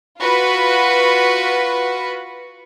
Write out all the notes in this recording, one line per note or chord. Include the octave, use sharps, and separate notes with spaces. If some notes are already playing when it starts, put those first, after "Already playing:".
F4 F#4 B4 B5